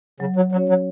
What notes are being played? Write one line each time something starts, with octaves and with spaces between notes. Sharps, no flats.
C#3 F#3
F#3
F#3 C#4 F#4 C#5
F#3